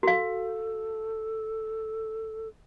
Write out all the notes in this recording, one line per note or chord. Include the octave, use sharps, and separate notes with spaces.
F#4 A4 F5